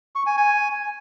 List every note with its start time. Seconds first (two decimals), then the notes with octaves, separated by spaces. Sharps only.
0.15 C#6
0.26 G#5
0.37 G#5